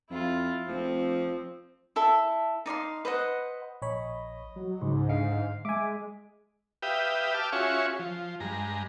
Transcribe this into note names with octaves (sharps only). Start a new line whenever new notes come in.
F2 E4 F4
F1 F3 C4
E4 A4 E5 A5
D#4 D5 F5 C6
B4 C5 D#5 F#5
A#1 C#5 D#5 B5
F#3
C#2 G#2
D3 F5
G#3 E5 G#5 D6
G4 B4 E5 F5 G5 D#6
G5 A5 D6 E6 F6
C#4 F4 F#4 G#4 E5 C#6
F3
G2 G#3 A#5